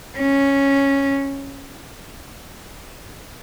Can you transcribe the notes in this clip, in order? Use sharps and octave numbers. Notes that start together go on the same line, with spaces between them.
C#4